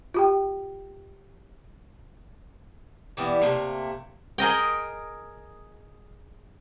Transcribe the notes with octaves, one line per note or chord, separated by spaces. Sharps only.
F4 G4 G5
E3 G3 B3 E4
C3 F3 A3 A#3
G#4 A#4 D#5 G5